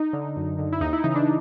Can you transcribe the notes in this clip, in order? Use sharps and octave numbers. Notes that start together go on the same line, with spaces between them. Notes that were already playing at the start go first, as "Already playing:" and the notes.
Already playing: D#4
D3
F#2
D3
E4
D#2 D#4
E4
C#3 E3 D#4
D4